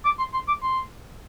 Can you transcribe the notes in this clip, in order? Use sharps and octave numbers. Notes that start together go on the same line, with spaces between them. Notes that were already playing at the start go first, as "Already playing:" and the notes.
D6
C6
C6
D6
C6